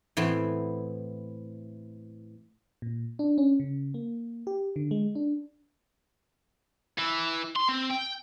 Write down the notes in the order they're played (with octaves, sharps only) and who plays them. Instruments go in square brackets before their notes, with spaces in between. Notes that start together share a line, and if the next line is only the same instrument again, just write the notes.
[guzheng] A2 E3 B3 C4
[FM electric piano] A#2
D4
C#4
C#3
A#3
G4
D3
G#3
D4
[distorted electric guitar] E3
C6
C4
G5